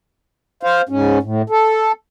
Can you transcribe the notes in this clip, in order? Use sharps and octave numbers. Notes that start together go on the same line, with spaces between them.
C5 F5
G#2 C#4
A2
A4